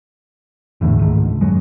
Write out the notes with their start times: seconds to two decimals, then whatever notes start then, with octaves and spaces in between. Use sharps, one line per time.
0.81 G#1 E2 A2 D3
0.99 C#2 G#2 D#3 A3
1.41 F#2 F#3 G#3